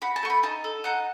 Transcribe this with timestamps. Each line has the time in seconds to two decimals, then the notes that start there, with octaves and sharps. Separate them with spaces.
0.02 F#4 B5
0.16 A5
0.23 A3 C#6
0.30 B5
0.43 D#4 A5
0.64 A4
0.84 D#4 F#5